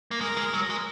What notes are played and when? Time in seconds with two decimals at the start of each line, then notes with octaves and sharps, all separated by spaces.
0.11 A#3
0.21 G#3 A#4
0.37 G#3
0.54 F#3
0.70 G#3